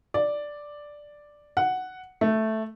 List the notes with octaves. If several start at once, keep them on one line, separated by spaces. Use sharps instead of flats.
D5
F#5
A3